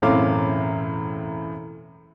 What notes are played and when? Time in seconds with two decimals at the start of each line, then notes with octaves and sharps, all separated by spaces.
0.02 E1 F#2 A2 C4 F5 D6